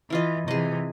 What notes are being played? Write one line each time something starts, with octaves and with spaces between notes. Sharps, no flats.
E3 E4 F4 D#5
C3 E3 G#4 D#5